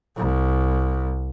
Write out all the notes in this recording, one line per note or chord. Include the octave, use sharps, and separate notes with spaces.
C2